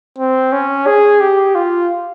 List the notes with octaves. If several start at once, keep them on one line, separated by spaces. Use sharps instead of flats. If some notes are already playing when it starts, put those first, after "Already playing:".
C4
C#4
G#4
G4
F4